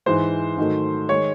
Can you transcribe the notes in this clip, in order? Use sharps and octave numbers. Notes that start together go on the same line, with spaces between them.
G#2 E3 G#3 C5
G#2 D#3 F#3 A3
D#3 G#3 C#5